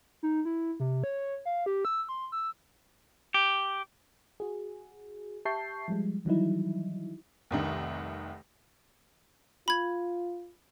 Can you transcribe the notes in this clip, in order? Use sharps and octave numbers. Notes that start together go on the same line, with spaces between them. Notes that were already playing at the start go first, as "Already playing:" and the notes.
D#4
E4
C3
C#5
F5
G4
E6
C6
E6
G4
F#4 G#4
G4 E5 A5 C#6 G6 C7
F3 G3 G#3
D#3 E3 F#3 G3 D#4 E4
F1 C2 D#3
F4 B5 G#6